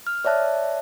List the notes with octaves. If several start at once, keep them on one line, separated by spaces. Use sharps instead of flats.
F6
C#5 D5 E5 A5 F#6